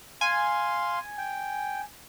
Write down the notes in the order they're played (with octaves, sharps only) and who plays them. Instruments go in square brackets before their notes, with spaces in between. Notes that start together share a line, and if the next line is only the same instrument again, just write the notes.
[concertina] F5 C6 [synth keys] G#5
[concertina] G5